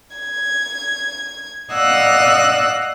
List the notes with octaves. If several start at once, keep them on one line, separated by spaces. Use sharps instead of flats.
G#6
D5 D#5 F5 F#5 E6 F#6